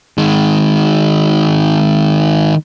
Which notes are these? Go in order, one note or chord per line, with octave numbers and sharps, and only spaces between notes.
D#3 G#3